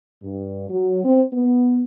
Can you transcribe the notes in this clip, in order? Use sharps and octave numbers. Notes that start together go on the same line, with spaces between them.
G2
F#3
C4
B3